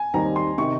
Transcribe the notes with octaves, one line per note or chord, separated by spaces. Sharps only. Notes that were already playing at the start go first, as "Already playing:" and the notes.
Already playing: G#5
D#2 D#3 G3 C4 A#5
C6
C3 D#3 C#6